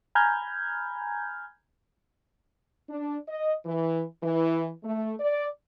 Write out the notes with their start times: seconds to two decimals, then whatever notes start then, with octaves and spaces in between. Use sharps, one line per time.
0.15 G#5 A#5 B5 F6 G6 G#6
2.89 D4
3.28 D#5
3.65 E3
4.22 E3
4.84 A3
5.20 D5